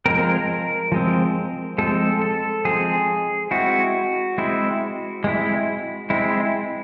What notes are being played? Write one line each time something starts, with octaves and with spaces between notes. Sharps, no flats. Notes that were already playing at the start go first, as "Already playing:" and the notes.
F3 G#3 C4 A#4
F3 G#3 C4
F3 G#3 C4 A4
A4
F3 G#3 C4 G#4
G#3 C4 E4 F#4
G#3 C4 E4
G#3 C4 E4
G#3 C4 E4